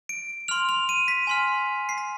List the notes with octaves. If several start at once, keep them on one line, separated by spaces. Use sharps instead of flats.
D7
C6 F6 F7
F7
D#7
B6
G#5 C6 F6
C7
B6